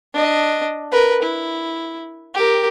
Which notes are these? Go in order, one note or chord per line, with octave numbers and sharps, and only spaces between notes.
D4 D#5
A#4 B4
E4
G4 A#4